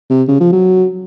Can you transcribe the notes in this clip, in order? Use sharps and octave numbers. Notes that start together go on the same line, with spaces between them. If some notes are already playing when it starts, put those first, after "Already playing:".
C3
C#3
F3
F#3